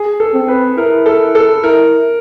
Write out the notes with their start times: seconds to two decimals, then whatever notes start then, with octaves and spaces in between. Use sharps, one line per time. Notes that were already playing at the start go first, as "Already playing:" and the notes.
Already playing: G#4
0.20 A4
0.34 C4
0.48 B4
0.77 E4 A#4
1.06 A4
1.35 A4
1.63 E4 A#4